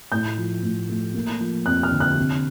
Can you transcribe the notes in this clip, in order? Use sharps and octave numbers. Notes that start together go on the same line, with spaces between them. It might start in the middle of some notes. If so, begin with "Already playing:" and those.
A2 G6
F3
A2
A3
A#3
F3
F2 F#6
F6
D3
F#6
C3